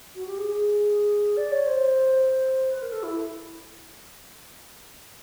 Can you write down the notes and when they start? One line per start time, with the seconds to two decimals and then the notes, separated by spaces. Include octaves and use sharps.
0.15 F#4
0.26 G4
0.37 G#4
0.48 G#4
1.37 D5
1.51 C#5
1.66 C5
2.71 B4
2.82 A#4
2.92 A4
3.03 E4